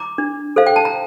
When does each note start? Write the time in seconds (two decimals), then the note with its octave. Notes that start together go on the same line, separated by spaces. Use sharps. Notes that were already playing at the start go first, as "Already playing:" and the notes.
Already playing: A#5 D6
0.18 D4
0.56 A4 C5 F5
0.66 G5
0.76 A5
0.85 A#5